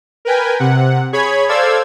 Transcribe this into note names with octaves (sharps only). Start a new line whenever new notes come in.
A#4 B4 G5 G#5
C3 F#5
G#4 C#5 B5 G#6
A4 C5 D5 F5 E6 G#6